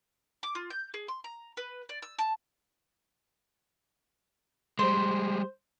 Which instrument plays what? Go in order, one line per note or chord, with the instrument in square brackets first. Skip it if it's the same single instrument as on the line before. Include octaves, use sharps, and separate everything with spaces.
[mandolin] D6
F4
G6
G#4
C6
A#5
B4
D5
E6
A5
[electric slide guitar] G3 G#3 [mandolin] C5